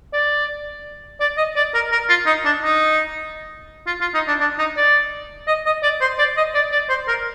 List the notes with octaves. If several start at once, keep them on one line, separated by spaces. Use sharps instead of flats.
D5
D5
D#5
D5
A#4
A#4
F4
D#4
D4
D#4
F4
F4
D#4
D4
D4
D#4
D5
D#5
D#5
D5
C5
D5
D#5
D5
D5
C5
A#4